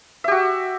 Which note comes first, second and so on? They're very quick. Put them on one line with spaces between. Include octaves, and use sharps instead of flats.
E5 G4 F#4